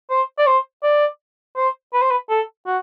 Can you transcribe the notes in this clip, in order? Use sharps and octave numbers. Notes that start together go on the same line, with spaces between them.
C5
D5
C5
D5
C5
B4
C5
B4
A4
F#4